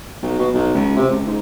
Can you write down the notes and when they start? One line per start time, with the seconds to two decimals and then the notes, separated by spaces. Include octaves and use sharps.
0.22 B1
0.39 B2
0.54 B1
0.74 C#2
0.96 C3
1.10 C#2
1.27 G#2